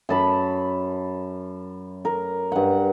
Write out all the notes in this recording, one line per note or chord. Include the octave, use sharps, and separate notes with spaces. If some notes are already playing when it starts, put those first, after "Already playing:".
F#2 A5 B5
A#4
G2 F#5